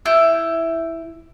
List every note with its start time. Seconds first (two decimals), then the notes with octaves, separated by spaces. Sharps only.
0.06 E4 G6